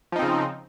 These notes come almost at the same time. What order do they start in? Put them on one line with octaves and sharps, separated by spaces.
F3 D#4 C4 C#3